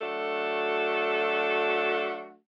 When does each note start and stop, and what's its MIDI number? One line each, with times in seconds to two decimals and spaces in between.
0.02 2.36 54
0.02 2.36 57
0.02 2.36 62
0.02 2.36 66
0.02 2.36 69